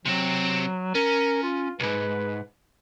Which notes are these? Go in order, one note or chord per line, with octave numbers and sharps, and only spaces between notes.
C3 F#3 C4
C#4 A#4
F4
B1 G#2 B4